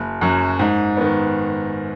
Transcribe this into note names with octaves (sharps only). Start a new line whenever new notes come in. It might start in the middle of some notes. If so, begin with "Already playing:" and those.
Already playing: F#1
F#2 F#3
G#2
D#3 B3